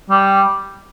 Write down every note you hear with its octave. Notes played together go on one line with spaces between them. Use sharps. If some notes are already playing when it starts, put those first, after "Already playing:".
G3